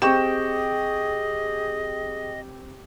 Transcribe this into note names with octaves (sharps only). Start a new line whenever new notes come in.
C4 G4 G#4 D#5 C#6 E7